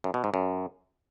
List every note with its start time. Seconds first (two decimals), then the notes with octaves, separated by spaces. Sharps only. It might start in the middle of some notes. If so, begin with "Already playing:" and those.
0.04 F#2
0.14 B2
0.24 G#2
0.34 F#2